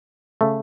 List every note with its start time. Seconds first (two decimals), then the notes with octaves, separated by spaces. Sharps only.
0.41 C#3 A3